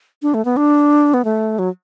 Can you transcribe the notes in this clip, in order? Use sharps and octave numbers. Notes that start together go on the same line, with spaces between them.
D4
A3
B3
D4
B3
A3
F#3